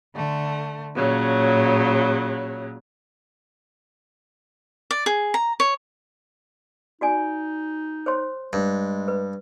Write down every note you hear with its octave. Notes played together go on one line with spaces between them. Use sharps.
D3 A3
A#2 C#3 F#3
D5
G#4
A#5
C#5
D#4 F#4 D5 G#5
C5 C#5 C6
G2 G#3
B4